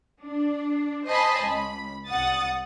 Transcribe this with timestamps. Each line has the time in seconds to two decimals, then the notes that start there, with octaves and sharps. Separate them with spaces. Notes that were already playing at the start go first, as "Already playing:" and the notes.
0.20 D4
1.06 C5 D#5 G#5 A5 B5 C6
1.44 C#2 B5
2.07 C2 F#5 D#6 A6